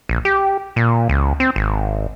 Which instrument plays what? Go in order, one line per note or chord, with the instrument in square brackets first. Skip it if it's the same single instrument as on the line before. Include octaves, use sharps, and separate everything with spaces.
[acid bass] A#1
G4
A#2
C#2
C4
G#1